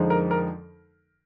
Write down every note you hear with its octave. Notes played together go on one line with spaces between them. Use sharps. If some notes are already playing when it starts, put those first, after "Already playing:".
Already playing: F2 D3 F3 G#3 D#4
A#4
A#4